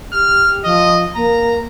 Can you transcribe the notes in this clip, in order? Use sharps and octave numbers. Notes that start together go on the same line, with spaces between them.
G4 F6
F3 D#5
A#3 A#5